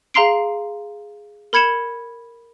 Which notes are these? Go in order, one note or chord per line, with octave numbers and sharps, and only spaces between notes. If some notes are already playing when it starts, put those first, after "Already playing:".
G#4 F5 A#5 C6 C7 D7
A#4 B5 G#6 C#7 E7